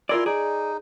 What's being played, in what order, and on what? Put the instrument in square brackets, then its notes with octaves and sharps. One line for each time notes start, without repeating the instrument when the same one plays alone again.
[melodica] E4 G#5 C6 [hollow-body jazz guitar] F4 A#4 D5
[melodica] D#4 [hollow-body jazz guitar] G#4 D5